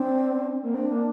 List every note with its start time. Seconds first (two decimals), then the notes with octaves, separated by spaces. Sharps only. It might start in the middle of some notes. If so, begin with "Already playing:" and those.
Already playing: C4 D4
0.63 A#3
0.74 C4 D4
0.90 A#3